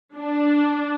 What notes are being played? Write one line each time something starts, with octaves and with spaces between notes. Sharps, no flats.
D4